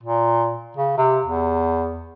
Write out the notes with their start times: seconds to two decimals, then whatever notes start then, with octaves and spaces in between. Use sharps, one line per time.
0.03 A#2
0.77 C#3
0.97 C3
1.25 E2